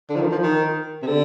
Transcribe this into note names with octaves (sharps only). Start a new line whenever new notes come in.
D3
F3
D#3
F3
D#3
C3
D3